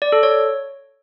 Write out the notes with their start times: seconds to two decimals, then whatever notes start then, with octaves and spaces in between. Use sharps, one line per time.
0.02 D5
0.12 A4
0.23 C#5